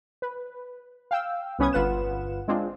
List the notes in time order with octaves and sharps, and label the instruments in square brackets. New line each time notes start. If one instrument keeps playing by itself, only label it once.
[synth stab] B4
F5 G5 E6
C2 B3 C#4 B4 D#6 G#6
G1 F4 B4 F#5 E7
G#3 C4 D4 F4